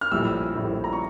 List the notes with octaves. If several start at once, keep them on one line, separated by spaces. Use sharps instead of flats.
F6
A#1 A2 G3 E6
A#1 A2 G3
A#5
C#6